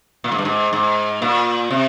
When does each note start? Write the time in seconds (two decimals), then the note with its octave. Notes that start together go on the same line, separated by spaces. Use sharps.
0.24 A#2
0.32 G#2
0.38 G2
0.45 G#2
0.73 G#2
1.22 A#2
1.71 C3